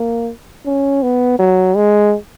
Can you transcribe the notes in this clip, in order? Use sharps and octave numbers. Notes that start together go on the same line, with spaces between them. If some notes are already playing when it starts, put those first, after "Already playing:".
Already playing: A#3
C#4
B3
F#3
G#3